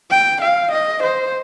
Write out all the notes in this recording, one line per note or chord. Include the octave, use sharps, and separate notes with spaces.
G5
F5
D#5
C5